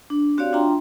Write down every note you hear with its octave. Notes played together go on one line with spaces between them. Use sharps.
D4
C4 F#4 G4 C#5 D5 F5
D4 F4 E5 G5 A#5 C6